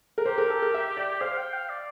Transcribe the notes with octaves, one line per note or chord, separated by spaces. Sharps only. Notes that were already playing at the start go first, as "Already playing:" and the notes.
A#4
G4 C5
A#4
A4
A#4
E5
D5
C5 F5
G5
F5
D5